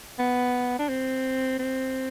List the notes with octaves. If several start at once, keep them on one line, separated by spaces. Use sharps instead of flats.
B3
D4
C4
C4